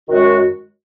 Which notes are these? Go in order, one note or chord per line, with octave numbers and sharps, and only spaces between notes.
F#2 D#3 G#3 F#4